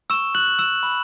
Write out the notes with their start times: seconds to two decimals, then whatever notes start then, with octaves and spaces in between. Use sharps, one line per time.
0.10 C#6 E6 E7
0.35 F#6 F#7
0.47 F#6
0.59 E6 E7
0.83 B5